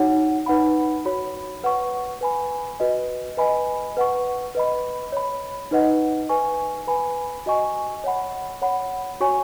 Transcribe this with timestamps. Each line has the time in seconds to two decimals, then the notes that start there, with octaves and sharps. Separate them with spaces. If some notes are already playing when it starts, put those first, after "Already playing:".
Already playing: D#4 F#4 C#5 F#5
0.46 D#4 B4 F#5 B5
1.05 F#4 C#5 B5
1.64 B4 F#5 C#6
2.21 B4 G#5 B5
2.80 F#4 B4 D#5
3.37 B4 D#5 G#5 B5
3.97 B4 F#5 C#6
4.55 B4 D#5 B5
5.12 C#5 B5
5.71 D#4 B4 D#5 F#5
6.29 B4 G#5 C#6
6.87 B4 G#5 B5
7.46 F#4 D#5 G#5 C#6
8.04 C#5 F#5 B5
8.62 C#5 F#5 B5
9.20 F#4 C#5 G#5 C#6